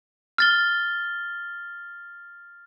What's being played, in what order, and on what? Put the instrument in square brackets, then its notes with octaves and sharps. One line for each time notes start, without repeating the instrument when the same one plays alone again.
[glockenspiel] F6 A6 G7